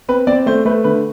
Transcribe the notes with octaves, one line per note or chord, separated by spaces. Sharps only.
C4 B4
C4 D5
A3 C5
A3 B4
D3 B4